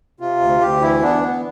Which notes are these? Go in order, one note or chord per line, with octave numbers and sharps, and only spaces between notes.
C3 F4
D2
D2 G4
E3 E4
B3 D4
B3